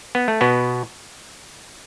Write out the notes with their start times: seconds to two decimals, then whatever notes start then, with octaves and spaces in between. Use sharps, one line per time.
0.15 B3
0.28 A3
0.41 B2 B3